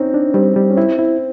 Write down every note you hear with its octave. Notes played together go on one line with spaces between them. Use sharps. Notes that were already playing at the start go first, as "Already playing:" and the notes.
Already playing: C4 C#4 D#4
D4
G3 C4
G3
C#4
C4 E4
E4